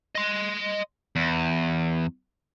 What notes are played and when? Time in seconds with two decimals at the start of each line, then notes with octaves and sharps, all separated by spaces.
0.15 D#5 C6
1.16 E2